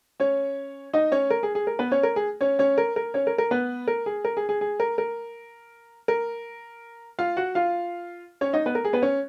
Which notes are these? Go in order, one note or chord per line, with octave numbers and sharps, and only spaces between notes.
C#4 C#5
D#4 D#5
C#4 C#5
A#4
G#4
G#4
A#4
B3 B4
C#4 C#5
A#4
G#4
C#4 C#5
C#4 C#5
A#4
A#4
C#4 C#5
A#4
A#4
B3 B4
A#4
G#4
A#4
G#4
G#4
G#4
A#4
A#4
A#4
F4 F5
F#4 F#5
F4 F5
C#4 C#5
D#4 D#5
B3 B4
A#4
G#4
B3 B4
C#4 C#5